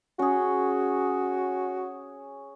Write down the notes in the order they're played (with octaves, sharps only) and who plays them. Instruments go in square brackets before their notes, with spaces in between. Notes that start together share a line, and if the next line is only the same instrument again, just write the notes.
[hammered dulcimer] C#4 G#4 [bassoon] F#4